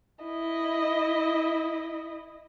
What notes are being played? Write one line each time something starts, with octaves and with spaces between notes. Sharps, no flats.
E4 D#5